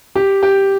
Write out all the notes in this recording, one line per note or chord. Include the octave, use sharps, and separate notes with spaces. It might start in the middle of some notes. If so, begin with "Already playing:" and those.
G4
G4